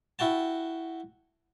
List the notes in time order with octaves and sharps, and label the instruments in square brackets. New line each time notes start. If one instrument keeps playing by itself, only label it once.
[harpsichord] E4 F#4 G5 A5